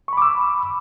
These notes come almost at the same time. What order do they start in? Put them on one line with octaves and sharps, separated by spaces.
C#6 B5 D6 E6